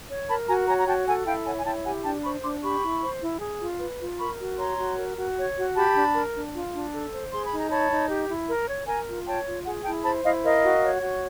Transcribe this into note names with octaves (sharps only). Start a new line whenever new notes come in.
C#5
A#4 A5 B5
F#4 G#5 A#5
C#5 G#5 A#5
A#5
F#4 G5 A5
A4 F#5 G#5
E4 F5 G5
C#5 F#5 G#5
G#5
E4 G5 A5
G4 F#5 G#5
D4 G5 A5
C5 B5 C#6
D4 C6 D6
G4 B5 C#6
E4
C5
E4
G#4
F4
B4
F4
A#4 B5 C#6
F#4
C#5 A#5 C6
F#4
A#4
F#4
C#5
F#4
G4 A5 B5
D4
A#4
D4
F4
D4
A4
C5
G#4 C6
B5
D#4
A#5
C#5 A5 B5
D#4
G4
E4
A#4
C#5
A#4 G#5 A#5
F4
C#5 G5 A5
F4
G#4 F#5 G#5
E4 G5 A5
C5 A5 B5
E4 D#5 F5
A#4 D#5 F5
F#4
C#5
F#4